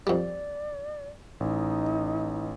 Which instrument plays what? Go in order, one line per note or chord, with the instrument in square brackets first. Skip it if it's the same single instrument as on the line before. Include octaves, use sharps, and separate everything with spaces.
[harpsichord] F2 G3 [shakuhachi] D5
[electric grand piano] A1 [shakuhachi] D#4